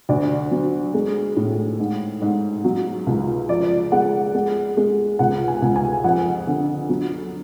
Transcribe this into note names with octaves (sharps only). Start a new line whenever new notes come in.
D2 D5
F#3
G#3
A2
G#2
G#2
F#3
C#2
F3 D5
G#3 F#5
G#3
G#3
C#2 F#5
G#5
C#2
G#5
F2 F#5
D3
F#3